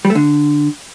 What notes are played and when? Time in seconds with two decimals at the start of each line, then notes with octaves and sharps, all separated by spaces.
0.05 G3
0.10 A3
0.15 D3